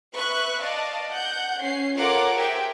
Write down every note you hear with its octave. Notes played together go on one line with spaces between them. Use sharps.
B4 E5 C#6 F#6
D5 D#5 F5 A5
F#5 G6
C#4 C7
F4 A4 A#4 C#5 F#5 D6
G4 G#4 A#4 C5 E5 G5